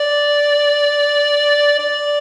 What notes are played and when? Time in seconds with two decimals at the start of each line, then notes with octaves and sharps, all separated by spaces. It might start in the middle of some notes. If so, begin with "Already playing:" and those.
Already playing: D5
1.79 D5